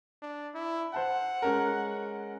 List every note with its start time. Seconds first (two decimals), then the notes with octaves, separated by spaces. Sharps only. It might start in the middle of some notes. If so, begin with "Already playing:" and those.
0.22 D4
0.55 E4
0.94 C5 F#5 A5
1.42 G#3 C#4 A#4